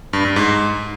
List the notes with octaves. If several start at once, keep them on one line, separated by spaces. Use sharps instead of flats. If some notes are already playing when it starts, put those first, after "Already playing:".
G2
G2
G#2